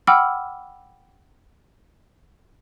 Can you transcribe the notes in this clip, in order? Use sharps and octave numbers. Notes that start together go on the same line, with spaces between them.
F#5 G5 B5 D6 E6 F6